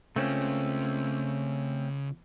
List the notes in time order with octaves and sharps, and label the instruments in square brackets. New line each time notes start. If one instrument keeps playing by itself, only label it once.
[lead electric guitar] C#3 F4 [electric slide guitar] A3 C4 C#4